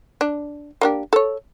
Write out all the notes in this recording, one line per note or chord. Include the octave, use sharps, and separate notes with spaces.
D4
A#3 D4 G4
A4 C#5